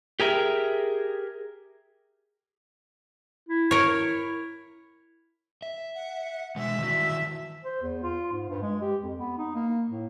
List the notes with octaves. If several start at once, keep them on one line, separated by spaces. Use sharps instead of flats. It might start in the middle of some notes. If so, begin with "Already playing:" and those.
G4 G#4 A#4 E5 G5
E4
A#4 C#5
E5
F#5
B2 G#3 E5
D#3 E3 F#4
C5
E2
F4
G#2
G2
G#3
G4
F2
B3
D#4
A#3
A2